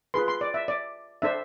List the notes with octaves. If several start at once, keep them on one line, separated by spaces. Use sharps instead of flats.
F4 G#4 B4 C6
C6
D5
E5
D5
D4 A4 C5 E5